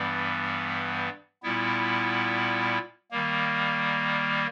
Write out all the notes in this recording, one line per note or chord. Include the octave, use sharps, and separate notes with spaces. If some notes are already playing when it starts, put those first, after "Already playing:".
Already playing: G2 E3 G3 B3
A#2 G3 B3 E4
D#3 G3 A#3